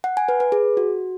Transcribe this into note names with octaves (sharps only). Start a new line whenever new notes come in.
F#5
G#5
B4
B4
G#4
F#4